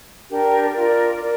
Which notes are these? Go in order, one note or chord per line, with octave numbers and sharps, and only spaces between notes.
D4 G4 A#4
F4 A#4 D5
A#4 D5